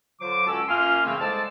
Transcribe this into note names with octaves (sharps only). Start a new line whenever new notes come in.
D3 F#3 F4 C5 D6
C#2 C#4 F#4 A4 A5 E6
F#2 A#3 F4 G#5 C6 F6
C#3 E3 A3 A#3 C4
C2 G#3 A4 C5 D5 A5